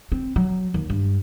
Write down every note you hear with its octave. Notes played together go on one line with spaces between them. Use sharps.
C4
F#3
D#2
G2